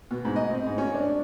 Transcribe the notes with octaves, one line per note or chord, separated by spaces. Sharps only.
B2
G#2
D#5
C4
G#2
C#4
D4